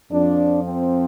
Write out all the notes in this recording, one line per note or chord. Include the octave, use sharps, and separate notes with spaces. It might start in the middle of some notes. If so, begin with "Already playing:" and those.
F2 F3 D4
C4